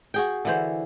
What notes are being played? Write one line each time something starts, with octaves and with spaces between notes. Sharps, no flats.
F#4 G#4 G5
D3 E3 C5